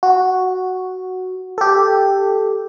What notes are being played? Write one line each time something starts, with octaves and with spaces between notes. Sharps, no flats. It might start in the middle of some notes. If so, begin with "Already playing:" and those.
F#4
G4 A4